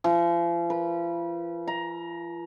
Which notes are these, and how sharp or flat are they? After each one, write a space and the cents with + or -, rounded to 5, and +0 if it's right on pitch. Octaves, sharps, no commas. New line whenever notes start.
F3 -40
B4 -30
A#5 +15